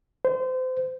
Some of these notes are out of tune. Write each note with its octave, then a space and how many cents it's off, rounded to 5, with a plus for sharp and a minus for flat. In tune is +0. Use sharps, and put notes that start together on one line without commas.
C5 -30